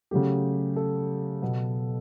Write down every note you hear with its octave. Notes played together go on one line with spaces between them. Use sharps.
C#3 F#3 A3 G4
A4
B2 F#3 B3